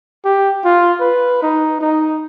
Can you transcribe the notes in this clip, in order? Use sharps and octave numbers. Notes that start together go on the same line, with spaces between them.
G4
F4
B4
D#4
D#4